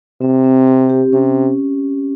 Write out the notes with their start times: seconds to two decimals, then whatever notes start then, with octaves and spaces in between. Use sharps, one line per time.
0.21 C3 C4
0.44 C4
0.68 G4
0.90 G4
1.13 C3 C#4